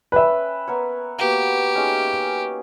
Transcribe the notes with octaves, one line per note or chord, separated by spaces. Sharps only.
C#4 B4 E5 G5
B3 A#4 C#5
A#3 B3 F#4 G4
C#4 D#4 G#4